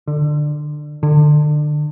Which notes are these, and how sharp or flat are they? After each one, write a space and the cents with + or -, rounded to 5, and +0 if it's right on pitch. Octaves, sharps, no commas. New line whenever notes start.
D3 +20
D3 +30